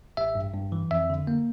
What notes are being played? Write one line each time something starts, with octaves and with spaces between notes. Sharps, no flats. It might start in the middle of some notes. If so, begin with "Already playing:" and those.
A1 E5
G2
G2
E3
F2 E5
D3
A#3